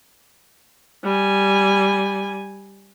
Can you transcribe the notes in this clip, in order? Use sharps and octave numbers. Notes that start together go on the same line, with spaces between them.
G3 G#5